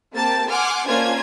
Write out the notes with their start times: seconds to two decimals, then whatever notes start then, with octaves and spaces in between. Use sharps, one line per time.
0.14 A#3 C4 G4 A5 A6
0.49 F#5 G#5 C6 D6 F6
0.87 A#3 C#4 D4 F4 C5 G#6